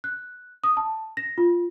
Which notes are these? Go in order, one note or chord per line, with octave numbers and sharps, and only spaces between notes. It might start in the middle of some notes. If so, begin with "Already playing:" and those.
F#6
D#6
A5
A#6
F4